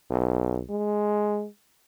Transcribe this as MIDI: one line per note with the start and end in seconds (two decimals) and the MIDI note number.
0.10 0.62 35
0.70 1.47 56